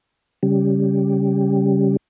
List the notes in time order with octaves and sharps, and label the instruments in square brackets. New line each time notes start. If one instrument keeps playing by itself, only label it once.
[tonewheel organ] C#3 G3